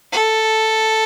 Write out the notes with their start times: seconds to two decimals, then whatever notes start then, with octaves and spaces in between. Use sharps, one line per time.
0.12 A4